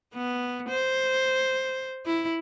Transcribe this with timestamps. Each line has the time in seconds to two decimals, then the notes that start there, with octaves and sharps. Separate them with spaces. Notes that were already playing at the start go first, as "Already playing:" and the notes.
0.14 B3
0.69 C5
2.06 E4